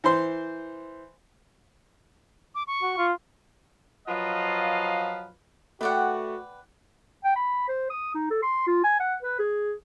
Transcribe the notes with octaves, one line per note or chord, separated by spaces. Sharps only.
E3 C5 C6
D6
C#6
F#4
F4
F3 F#3 F4 B4 D#5 F5
A3 F#4 B4 D5 F#5 G5 D#6
G5
B5
C5
D#6
D#4
A4
C6
F4
G#5
F#5
B4
G#4